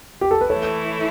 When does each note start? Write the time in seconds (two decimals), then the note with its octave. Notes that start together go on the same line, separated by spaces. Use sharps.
0.21 G4
0.31 A4
0.41 B4
0.50 E3 A3 E4 A4 C#5